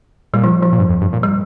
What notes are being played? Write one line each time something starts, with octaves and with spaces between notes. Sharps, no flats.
A#2 G3
F3
F3
A#2
G2
F2
G2
A#2
G3